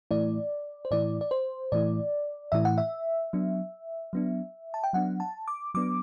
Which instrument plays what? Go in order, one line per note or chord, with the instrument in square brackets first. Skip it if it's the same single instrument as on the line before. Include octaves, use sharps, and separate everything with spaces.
[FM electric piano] A2 E3 A3 E4 D5
C5
A2 E3 A3 E4 D5
D5
C5
A2 E3 A3 E4 D5
A2 E3 A3 E4 E5
F#5
E5
F#3 B3 D4
F#3 B3 D4
A5
G5
F#3 B3 D4 F#5
A5
D6
F#3 B3 D4 D6